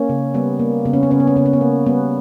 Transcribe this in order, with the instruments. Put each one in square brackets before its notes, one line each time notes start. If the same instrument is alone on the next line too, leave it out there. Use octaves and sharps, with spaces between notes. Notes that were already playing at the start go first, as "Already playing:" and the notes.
Already playing: [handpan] A#3 C#4
C#3
G3 B3
A#3
C#3 B3
C#4
B3
C#3 C#4
B3
C#4
C#3 B3
C#4
B3
A#3
G3 B3